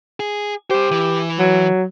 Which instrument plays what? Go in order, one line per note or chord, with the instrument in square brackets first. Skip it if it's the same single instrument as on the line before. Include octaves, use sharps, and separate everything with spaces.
[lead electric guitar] G#4
[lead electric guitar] G3 C5 [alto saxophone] G4
[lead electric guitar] E3
[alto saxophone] F#3